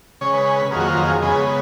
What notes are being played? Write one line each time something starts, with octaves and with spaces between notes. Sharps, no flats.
C#3 G#3 C#4 C#5
B4
B4
B4
F2 D#3 F#3 A#3 G#4
F#4
F4
G#4
C#3 G#3 B3 G#4